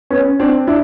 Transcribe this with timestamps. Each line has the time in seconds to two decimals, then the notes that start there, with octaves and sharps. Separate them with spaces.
0.11 B3 C#4
0.40 C4 D4
0.67 D4 E4